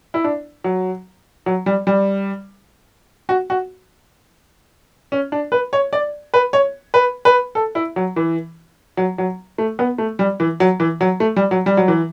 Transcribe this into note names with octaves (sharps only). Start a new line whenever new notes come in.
E4
D4
F#3
F#3
G3
G3
F#4
F#4
C#4
D4
B4
C#5
D5
B4
C#5
B4
B4
A4
E4
F#3
E3
F#3
F#3
A3
B3
A3
G3
E3
F#3
E3
F#3
A3
G3
F#3
G3
F#3
E3